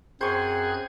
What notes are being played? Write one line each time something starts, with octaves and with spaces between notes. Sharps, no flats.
F#2 C4 G#4 C5 C#6 F#6 G#6